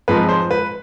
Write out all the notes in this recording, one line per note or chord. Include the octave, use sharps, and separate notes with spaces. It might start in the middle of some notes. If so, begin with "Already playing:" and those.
G#2 F3 G#3 C4 B4
C5
B4